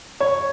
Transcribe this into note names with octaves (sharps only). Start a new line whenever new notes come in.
C#5